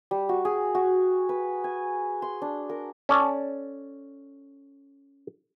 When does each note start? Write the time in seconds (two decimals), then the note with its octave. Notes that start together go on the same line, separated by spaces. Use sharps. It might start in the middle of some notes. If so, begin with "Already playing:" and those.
0.11 G3
0.29 F#4
0.45 G#4
0.75 F#4
1.29 B4
1.64 G#5
2.22 C6
2.42 D4
2.69 A#4
3.09 C#4 A4 D5 A5